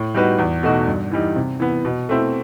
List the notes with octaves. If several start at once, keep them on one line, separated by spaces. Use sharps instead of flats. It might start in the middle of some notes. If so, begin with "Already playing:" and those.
Already playing: A2
G3 D#4 F#4 B4
E2
B2 A3 D#4 F#4
G2
E3 G3 D#4
C3
E3 B3
B2
A3 C4 E4